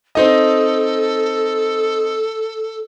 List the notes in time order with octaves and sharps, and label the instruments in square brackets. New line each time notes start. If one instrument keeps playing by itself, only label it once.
[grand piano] C4 D#4 D#5 [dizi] A4